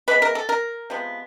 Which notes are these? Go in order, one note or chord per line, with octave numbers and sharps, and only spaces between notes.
E3 G#3 B3 B4
A#4
A4
A#4
C3 F3 G#3 B3